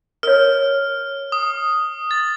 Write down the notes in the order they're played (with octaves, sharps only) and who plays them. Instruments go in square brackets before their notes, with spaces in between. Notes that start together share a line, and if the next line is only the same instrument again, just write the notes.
[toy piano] A#4 C#5 [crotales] F6
[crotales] D#6
A6